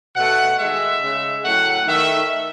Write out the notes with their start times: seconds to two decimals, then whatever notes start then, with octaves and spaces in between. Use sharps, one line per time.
0.16 B2 A3 F#5
0.59 D#3 G#3 E5
1.02 C#3 G#3
1.44 A2 F#3 A3 F#5
1.88 D#3 A3 E5